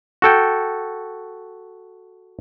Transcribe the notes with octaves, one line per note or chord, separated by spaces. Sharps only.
F#4 A4 G5